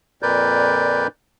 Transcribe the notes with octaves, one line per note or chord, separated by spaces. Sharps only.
F2 A#2 A#4 B4 D5 G6